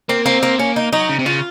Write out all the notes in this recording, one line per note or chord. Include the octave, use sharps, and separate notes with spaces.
A#3 C4
A#3 C4
A#3
A#3 C#4
D#4
F#3 D#4
C#3
C3
C#3 F4